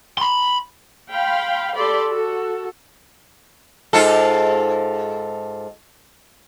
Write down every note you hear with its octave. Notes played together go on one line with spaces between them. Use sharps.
B5 C6
F5 G5 B5 C6
G4 A4 D5 B5 C6
F#4 A4
G#2 F4 A4